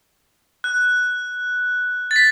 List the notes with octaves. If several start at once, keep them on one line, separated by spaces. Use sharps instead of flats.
F#6
A6
B6